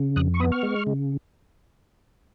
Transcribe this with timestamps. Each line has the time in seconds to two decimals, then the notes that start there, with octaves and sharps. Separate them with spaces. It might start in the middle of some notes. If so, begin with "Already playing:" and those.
Already playing: C#3
0.16 F2 D#6 F#6
0.34 C#6
0.40 B3 B5 D#6
0.52 C#6 F6
0.63 G#3
0.87 C#3